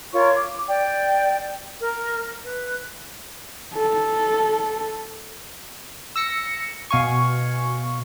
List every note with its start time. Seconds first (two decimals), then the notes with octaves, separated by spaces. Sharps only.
0.13 F4 A#4 C#5 C#6
0.35 D6
0.68 D5 G5
1.81 A#4
2.43 B4
3.74 A4
6.16 E6 A#6 C#7
6.91 B2 F5 G#5 C#6